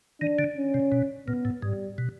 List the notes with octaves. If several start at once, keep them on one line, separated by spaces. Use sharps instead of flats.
D#3 D4
D3
C#4
C3
B2
A#2 B3
A2
G#2 G3
B2